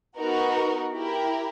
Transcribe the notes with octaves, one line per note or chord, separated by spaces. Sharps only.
B3 D#4 F#4 A#4
E4 G4 A#4